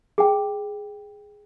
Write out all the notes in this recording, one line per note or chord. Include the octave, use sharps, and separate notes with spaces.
G#4 G5